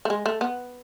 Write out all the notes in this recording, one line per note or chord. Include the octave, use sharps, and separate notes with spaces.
A3
G#3
A3
B3